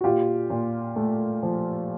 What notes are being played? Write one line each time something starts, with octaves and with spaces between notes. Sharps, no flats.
F#4
A#2 F4 G4
A#2
A3
F3